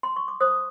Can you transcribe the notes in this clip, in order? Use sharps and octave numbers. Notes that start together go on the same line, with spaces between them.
C6
C#6
D6
C5 D#6